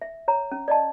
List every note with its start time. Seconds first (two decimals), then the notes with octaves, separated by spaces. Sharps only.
0.02 E5
0.28 C#5 A#5
0.52 C#4
0.68 D5 D#5 A5